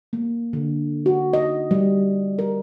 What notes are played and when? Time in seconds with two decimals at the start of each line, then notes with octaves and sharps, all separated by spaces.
0.13 A#3
0.53 D3
1.06 F#4
1.33 D#5
1.71 G3
2.39 A#4